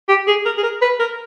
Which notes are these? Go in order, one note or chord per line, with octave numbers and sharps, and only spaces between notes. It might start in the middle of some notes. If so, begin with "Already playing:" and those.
G4
G#4
A#4
G#4
A#4
B4
A#4